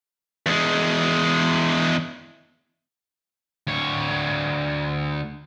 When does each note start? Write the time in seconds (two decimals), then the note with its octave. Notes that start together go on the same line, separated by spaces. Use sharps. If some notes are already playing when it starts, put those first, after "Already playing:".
0.46 E2 G#3
3.67 D2 C#5